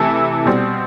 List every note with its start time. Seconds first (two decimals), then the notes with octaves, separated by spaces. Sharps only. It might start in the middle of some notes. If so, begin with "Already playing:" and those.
Already playing: C3 E3 A3 E4 A4
0.46 B2 G3 C4